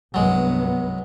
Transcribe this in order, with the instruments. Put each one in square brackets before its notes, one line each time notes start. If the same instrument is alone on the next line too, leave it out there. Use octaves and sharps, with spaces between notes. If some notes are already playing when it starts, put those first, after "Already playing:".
[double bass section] C2 G2 B3 [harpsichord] F#3 G#3